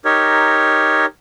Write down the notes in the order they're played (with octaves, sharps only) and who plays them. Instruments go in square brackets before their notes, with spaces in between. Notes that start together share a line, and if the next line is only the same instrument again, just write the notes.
[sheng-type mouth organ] D#4 G4 A#4 C#5